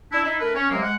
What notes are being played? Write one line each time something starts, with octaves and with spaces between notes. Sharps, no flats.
D4 E4
D#4 E4
A3 D4 A#4 B4
C#4
C3 F#3 G#3 A#3
G#3 F#5